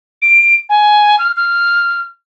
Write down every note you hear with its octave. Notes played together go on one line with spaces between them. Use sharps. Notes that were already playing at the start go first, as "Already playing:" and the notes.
D7
G#5
F6
F6